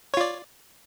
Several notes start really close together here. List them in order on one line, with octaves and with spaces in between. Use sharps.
C#5 F4 D5